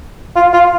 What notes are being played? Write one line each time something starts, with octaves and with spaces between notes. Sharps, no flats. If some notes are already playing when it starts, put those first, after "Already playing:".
F4
F4